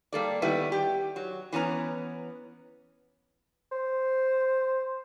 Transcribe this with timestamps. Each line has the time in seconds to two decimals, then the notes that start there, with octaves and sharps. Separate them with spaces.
0.13 G3 A#3 A4 D5
0.42 D#3 G3 B3 E4 B4
0.72 G4
1.16 F#3
1.52 E3 B3 C#4 A#5
3.72 C5